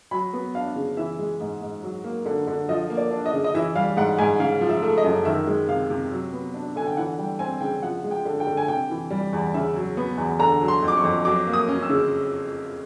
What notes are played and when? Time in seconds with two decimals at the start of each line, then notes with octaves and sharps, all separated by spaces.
0.11 F#3 B5
0.33 B3
0.55 D4 F5
0.75 C#3
0.97 E3 E5
1.19 G#3
1.40 G#2
1.62 G#2
1.83 F#3
2.04 A#3
2.26 D3
2.47 D3
2.69 F3 D#5
2.90 A#3
2.97 D5
3.11 D4
3.26 D#5
3.33 C#3
3.44 D#5
3.55 E3 E5
3.75 G3 F5
3.97 G#2 F#5
4.18 G#2 G#5
4.40 C#3 F5
4.61 F3
4.69 E5
4.83 A3
4.98 D#5
5.04 F#2
5.25 D#3 E5
5.47 G#3
5.68 C3 F5
5.90 C3
6.11 F#3
6.33 B3
6.54 D4
6.76 D3 G#5
6.87 G5
6.97 E3 F#5
7.18 G3 G5
7.39 C4 G#5
7.61 C#3 G5
7.83 F3 F#5
8.04 G#3
8.11 G5
8.25 D3
8.40 G5
8.47 D3
8.57 G#5
8.68 C3 G5
8.90 E3
9.11 G3
9.33 E2
9.54 C#3 E5
9.76 F#3
9.97 B3
10.18 E2
10.39 D3 A#5
10.61 F#3
10.68 C6
10.82 F2
10.88 D6
10.97 C#6
11.03 F2
11.25 F#3 D6
11.47 A#3
11.53 D#6
11.68 C#4
11.83 E6
11.89 C#3